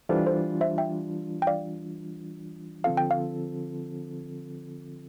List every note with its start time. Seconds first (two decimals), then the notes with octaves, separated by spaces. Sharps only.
0.09 E3 G3 D4 F4 A4 C5
0.27 A4 C5
0.61 C5 E5
0.78 E5 G5
1.42 G5
1.47 D5 F5
2.84 D3 F3 C4 F4 A4 F5
2.97 G5
3.11 F5